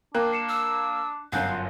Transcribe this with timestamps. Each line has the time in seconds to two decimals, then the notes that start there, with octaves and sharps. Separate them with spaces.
0.15 A#3 D4 A#4 G5 F#6
0.32 C7 C#7 E7
0.49 E6
1.32 G1 F#2 F5 F#5 F#6 G6
1.50 F4